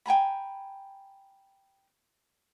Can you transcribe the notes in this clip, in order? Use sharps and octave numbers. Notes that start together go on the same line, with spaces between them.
G5 G#5 A#5 B5